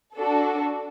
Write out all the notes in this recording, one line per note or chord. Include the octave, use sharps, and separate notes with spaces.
D4 F#4 A4